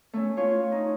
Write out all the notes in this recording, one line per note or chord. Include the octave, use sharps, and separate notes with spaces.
A3 C#4
F4 C#5
D#4